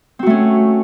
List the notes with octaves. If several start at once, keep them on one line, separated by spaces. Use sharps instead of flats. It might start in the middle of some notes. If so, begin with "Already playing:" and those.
A3 C4 C#4 F#4